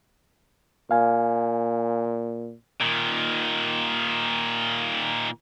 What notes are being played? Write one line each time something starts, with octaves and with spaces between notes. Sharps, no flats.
A#2 F5 G#5
A#2 D#3